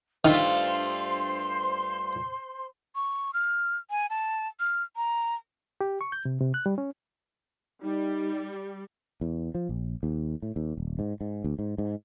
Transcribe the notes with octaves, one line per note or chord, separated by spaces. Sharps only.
G2 D#3 A3 F4 C5 C6
C#6
F6
G#5
A5
F6
A#5
G4
C#6
G6
C3
C3
F#6
G3
C#4
G3 D#4
E2
F3
A#1
D#2
A2
D#2
D#1
G#2
G#2
D2
G#2
G#2